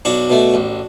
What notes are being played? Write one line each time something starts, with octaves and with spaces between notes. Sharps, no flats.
B1 D4 F#4
B2 A3
A1